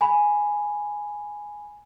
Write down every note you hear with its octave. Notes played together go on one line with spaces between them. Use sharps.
G#5 B5